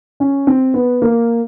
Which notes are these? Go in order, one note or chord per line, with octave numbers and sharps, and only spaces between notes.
C#4
C4
B3
A#3